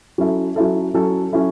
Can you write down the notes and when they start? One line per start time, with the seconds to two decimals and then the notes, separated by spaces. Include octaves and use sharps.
0.18 F#3 C#4 E4 A4
0.56 F#3 C#4 E4 A4
0.94 F#3 C#4 E4 A4
1.32 F#3 C#4 E4 A4